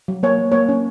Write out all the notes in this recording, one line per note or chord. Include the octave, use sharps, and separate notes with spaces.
F#3
A#3 C#5
F#3
A#3 C#5
C#4